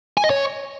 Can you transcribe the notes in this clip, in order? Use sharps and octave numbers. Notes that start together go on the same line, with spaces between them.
G#5
D#5
C#5